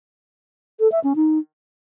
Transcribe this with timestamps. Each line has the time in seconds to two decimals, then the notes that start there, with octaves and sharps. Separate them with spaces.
0.80 A4
0.92 E5
1.04 C#4
1.16 D#4